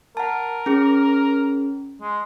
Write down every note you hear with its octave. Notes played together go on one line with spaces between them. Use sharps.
A#4 F#5 A5
C#4 G#4
G#3